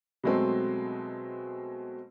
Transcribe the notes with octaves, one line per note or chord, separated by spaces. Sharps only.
B2 F#3 G#3 A3 C4